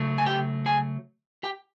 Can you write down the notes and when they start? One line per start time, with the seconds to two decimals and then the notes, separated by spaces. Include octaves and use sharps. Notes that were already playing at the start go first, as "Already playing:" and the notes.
Already playing: C#3 F#3 A3
0.18 G#5
0.26 G4 G5
0.66 G#4 G#5
1.43 G4 G5